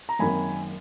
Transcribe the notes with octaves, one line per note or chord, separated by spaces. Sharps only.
A#5
G#1 F#2 D#3 A#3 G#5 B5